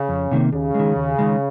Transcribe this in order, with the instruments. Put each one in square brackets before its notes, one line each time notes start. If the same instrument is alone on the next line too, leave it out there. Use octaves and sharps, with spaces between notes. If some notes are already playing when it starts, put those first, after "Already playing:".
Already playing: [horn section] C#3
[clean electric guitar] F2
C3 D#3 G3 A#3
[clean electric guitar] D#2 [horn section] C#3
[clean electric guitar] D#3 G#3
D#2
D#3 G#3